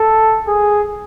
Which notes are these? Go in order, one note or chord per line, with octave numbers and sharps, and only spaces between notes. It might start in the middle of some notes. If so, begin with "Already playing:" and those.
Already playing: A4
G#4